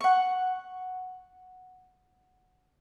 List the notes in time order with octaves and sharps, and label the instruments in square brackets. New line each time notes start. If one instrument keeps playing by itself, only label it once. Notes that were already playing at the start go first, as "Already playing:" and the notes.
[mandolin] F#5 C#6